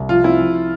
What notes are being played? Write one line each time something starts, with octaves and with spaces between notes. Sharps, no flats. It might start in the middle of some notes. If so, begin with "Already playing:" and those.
Already playing: C2
F3 F4
C4 E4
F3